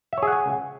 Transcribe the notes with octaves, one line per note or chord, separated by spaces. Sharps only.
G#4 C#5 E5 F#5 G#5